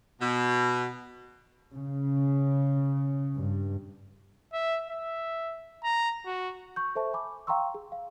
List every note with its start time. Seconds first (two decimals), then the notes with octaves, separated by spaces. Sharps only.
0.22 B2
1.74 C#3
3.37 G2
4.53 E5
4.90 E5
5.84 A#5
6.26 F#4
6.76 C#6 G6
6.95 A4 C5 E5 A5 C#6
7.13 G#5 B5 D6
7.47 F5 G5 A#5 C6 C#6 E6
7.74 G#4
7.92 F5